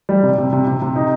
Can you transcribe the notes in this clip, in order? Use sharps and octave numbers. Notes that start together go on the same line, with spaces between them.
G3
C3
C3
C3
C3
C3
D#4